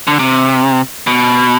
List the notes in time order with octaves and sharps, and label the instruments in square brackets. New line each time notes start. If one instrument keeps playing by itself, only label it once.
[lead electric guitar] D3
C3
B2